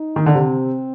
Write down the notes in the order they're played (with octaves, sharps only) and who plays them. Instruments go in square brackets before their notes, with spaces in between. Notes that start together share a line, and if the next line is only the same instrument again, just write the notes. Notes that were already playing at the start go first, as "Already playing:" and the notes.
Already playing: [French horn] D#4
[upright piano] D#3
D3
[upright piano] C3 [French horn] C4